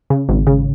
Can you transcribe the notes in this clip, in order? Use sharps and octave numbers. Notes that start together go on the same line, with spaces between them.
C#3
G#1
C#3